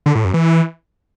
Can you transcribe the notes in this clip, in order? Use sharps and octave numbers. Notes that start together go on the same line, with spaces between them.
D3
A2
F#2
E3